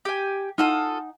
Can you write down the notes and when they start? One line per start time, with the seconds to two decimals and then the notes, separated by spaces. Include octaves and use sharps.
0.05 G4 G#5
0.58 D#4 F4 A4 F#5 G#5 D#6